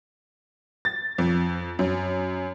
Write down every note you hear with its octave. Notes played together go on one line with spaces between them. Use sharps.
A6
F2
F#2